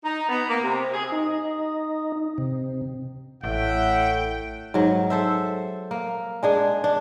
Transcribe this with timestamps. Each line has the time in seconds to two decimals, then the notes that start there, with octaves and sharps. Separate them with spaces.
0.04 D#4
0.29 B3
0.49 A#3
0.62 C3
0.93 G#4
1.12 D#4
2.38 C3
3.44 A1 A2 E5 F#5 G5
4.74 G#2 F#3
5.10 A4 C5 E5
5.91 A#3
6.43 G#3 D4 G#4
6.84 D4